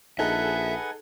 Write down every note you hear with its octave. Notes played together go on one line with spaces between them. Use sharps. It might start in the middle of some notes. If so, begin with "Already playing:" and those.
A#1 D#4 G#4 A4 B4 E5 F#5 G#5